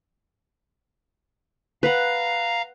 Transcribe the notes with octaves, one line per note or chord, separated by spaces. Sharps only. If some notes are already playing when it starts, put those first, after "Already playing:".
B4 F5 F#5 A#5